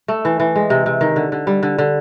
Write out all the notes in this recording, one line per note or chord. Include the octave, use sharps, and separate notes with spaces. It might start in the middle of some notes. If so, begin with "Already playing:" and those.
A3
E3
E3
G#3
C3
C3
D#3
D3
D3
G3
D3
D3